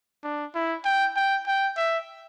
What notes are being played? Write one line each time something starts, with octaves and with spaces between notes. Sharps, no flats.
D4
E4
G5
G5
G5
E5